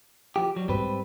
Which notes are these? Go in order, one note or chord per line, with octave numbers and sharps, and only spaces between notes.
F3 G4
F#3 G3
G#2 G3 C4 B4